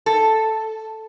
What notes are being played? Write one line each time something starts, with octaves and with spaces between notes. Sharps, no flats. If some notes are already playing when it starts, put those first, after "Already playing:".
A4